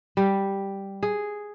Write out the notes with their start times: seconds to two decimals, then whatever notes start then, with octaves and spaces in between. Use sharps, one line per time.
0.17 G3
1.03 G#4